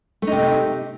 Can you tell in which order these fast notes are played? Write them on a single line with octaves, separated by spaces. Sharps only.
A3 D#4 C3